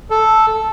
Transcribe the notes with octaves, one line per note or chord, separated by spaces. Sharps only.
A4